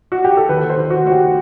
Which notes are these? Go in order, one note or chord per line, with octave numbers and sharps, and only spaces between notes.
F#4
G4
A4
D#2 B4
C5
D#3
F#4
A3 F#4
G4